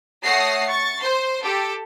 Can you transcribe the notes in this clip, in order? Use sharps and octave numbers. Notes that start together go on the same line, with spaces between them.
A3 C#5 F#5 D#6 A#6 C7
C#6 A6
C5 C6
G4 A4